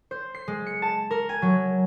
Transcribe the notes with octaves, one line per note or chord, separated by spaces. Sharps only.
C5
C7
G#3
C#7
A5
A#4
G#5
F#3